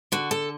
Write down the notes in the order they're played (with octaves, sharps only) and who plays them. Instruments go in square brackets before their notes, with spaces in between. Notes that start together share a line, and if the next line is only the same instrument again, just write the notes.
[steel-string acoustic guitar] D3 F#4
A4